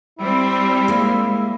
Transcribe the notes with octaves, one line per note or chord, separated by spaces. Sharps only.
G3 C4 E4
G#3 A#3